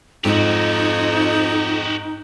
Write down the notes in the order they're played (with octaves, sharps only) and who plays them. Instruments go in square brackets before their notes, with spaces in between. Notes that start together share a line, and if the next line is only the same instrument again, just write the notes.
[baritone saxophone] F2 [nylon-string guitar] G#2 [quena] D#4 [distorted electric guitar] F#4 G4